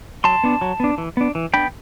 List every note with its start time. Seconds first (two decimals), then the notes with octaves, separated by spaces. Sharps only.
0.24 F#3 A5 C6
0.44 B3 D4
0.61 F#3
0.80 B3 D4
0.98 E3
1.17 B3 D4
1.35 E3
1.54 B3 D4 G5 B5